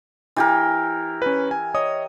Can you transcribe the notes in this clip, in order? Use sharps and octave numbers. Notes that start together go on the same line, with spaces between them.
E3 G4 A#4
C#4 B4
G#5
C#5 D#5 D#6